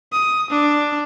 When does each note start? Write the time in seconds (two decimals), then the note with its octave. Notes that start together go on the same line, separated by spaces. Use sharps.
0.12 D#6
0.50 D4